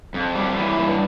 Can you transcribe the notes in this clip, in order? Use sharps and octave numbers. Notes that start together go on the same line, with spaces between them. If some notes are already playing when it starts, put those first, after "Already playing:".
F2
G3
E3
G2